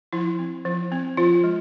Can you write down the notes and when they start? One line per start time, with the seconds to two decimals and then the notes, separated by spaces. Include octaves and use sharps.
0.13 F3 E4
0.39 C4
0.65 F3
0.92 C4
1.17 F3 F4
1.44 G#3